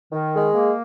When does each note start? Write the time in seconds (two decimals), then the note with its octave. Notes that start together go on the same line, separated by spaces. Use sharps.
0.12 D#3
0.33 G#3
0.54 A#3